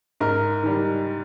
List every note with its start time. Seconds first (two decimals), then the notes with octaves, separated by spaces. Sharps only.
0.20 G#2 A#4
0.63 D#3 G3